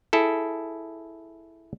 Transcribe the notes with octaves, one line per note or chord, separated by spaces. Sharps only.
E4 G#4 A4